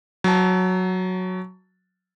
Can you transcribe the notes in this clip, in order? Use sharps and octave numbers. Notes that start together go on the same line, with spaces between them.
F#3 A5